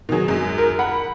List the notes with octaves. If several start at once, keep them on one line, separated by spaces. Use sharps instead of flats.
B2 D#3 F#3 G#4
F#2 G#3
A#4
F#5 B5